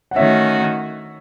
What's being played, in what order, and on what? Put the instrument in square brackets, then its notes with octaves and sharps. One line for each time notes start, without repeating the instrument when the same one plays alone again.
[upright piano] F#5
[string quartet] D#3 A3 C#4 F#4 [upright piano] C#5 E5